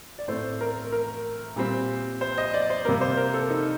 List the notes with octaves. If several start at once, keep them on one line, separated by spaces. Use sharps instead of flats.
D5
A2 A3 C4 C5
A#4
A#4
A#2 G3 C4
C5
D#5
D5
C5
C3 G3 A#3 A#4
C5
A#4
A4
D#4